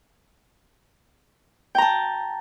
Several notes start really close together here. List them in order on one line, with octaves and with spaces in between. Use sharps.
G5 A#5 A5